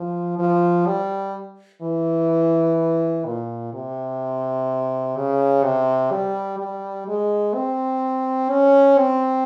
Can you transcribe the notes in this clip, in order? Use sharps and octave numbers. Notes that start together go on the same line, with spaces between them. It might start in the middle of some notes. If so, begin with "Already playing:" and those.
Already playing: F3
F3
G3
E3
A#2
C3
C#3
C3
G3
G3
G#3
C4
C#4
C4